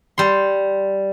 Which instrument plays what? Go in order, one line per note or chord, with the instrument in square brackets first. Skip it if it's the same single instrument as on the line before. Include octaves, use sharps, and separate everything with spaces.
[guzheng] G3 C6